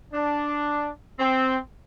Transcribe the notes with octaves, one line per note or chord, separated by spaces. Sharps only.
D4
C4